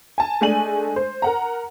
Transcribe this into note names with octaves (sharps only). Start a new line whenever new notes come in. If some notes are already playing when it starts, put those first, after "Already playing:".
G#5 A5
G#3 A3 D4 G#5 D#7 F#7
C5
A#4 F#5 A#5